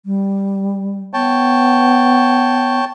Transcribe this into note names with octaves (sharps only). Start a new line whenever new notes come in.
G3
B3 C#5 G5 A5